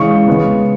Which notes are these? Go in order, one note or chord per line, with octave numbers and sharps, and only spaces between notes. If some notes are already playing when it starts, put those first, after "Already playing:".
Already playing: C#3 E3 G#3 C#6
C#3 G#3 B3